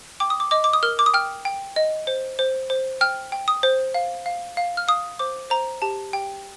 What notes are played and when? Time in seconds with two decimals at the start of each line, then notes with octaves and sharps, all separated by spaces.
0.20 G5 D6
0.30 D#6
0.40 D6
0.51 D#5 D6
0.64 D6
0.73 D#6
0.83 A#4 F6
0.99 D6
1.06 D#6
1.14 G5 F6
1.45 G5
1.76 D#5
2.07 C5
2.39 C5
2.70 C5
3.01 G5 F6
3.32 G5
3.48 D#6
3.63 C5
3.94 F5
4.26 F5
4.57 F5
4.77 F6
4.88 F5 D#6
5.19 C5 D6
5.50 C5 A#5
5.82 G4 A5
6.13 G4 G5